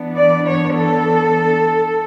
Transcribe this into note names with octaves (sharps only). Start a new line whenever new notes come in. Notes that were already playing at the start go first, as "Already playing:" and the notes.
Already playing: E3 B3 D4
D5
C#5
A4